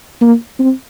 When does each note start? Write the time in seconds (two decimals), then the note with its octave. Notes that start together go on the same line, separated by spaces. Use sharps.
0.21 A#3
0.59 C4